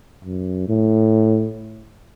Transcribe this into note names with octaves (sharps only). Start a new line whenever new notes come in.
F#2
A2